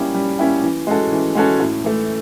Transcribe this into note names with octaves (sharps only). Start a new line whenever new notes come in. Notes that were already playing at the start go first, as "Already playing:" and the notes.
Already playing: G3 A#3 C#4 E4 G4
G3
A#3 C#4 E4 G4
E3
G#3 C#4 F#4 A4
E3
G#3 C#4 F#4 A4
A2
E3 A3